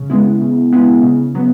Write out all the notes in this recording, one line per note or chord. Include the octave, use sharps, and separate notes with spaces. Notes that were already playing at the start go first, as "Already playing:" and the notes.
Already playing: C#3
G#3 B3 E4
C#3
G#3 B3 E4
C#3
F#3 B3